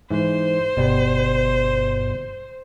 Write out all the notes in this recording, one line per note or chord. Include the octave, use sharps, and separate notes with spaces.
G#2 E3 C5
G1 B2 G3